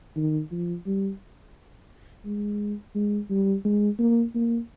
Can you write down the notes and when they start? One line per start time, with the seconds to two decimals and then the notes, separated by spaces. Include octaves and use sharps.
0.16 D#3
0.51 F3
0.86 G3
2.25 G#3
2.95 G#3
3.30 G3
3.65 G#3
3.99 A#3
4.35 A#3